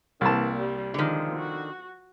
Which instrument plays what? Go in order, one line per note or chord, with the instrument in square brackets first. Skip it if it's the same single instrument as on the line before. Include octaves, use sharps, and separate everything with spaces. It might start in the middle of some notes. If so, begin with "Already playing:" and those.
[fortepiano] C2 A5 [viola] E3 A#3
[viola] G3
[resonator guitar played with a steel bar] D3 D#3 [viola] F3 G#3
[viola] F#4